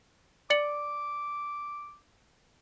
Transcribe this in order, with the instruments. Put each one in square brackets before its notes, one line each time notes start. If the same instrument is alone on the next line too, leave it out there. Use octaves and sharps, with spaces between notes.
[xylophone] D5 C#7 F#7 [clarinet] D6